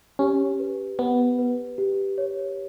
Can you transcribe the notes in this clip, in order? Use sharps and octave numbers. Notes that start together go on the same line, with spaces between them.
C#4 G4
B4
B3 G4
B4
G4
C#5